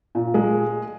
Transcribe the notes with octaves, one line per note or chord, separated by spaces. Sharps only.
A#2
G#3